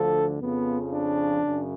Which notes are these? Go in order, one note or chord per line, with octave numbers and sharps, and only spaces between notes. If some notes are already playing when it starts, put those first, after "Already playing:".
Already playing: D2 D3 F3 A4
F2 C#3 F3 B3
D4
F#2 C#3